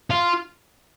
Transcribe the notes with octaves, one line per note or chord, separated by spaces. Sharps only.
F4